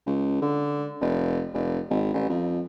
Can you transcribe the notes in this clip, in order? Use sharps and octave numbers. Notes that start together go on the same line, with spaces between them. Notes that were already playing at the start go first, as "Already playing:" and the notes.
C#2
D3
F1
F1
G#1
A1
F2